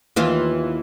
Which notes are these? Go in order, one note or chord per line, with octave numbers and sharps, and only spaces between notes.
D#2 E3 F4